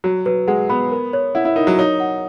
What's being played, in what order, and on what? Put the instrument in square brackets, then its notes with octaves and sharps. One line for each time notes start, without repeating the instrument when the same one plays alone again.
[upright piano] F#3 [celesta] F#4
[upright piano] F#3 [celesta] B4
[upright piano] G#3 [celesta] F#5
[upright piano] B3 [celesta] B5
[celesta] A#4
C#5
[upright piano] E4 [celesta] F#5
[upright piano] E4
[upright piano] D#4 [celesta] A#4
[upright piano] F#3
[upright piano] D#4 [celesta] C#5
[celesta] F#5